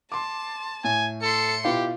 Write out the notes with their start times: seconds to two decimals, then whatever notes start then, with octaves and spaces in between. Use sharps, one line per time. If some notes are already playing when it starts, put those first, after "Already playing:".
0.12 A5 C6 D6
0.84 A2 G#5
1.22 A4 C6 C#7
1.65 B2 E4 F4 G4